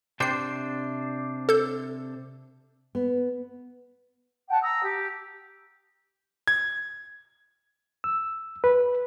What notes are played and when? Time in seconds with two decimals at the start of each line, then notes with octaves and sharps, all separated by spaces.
0.20 C3 D4 C5 G5 C7
1.49 A4 G6
2.95 B3
4.49 F#5 G5 A5
4.61 A#5 D#6 E6
4.82 G4
6.48 G#6
8.04 E6
8.64 B4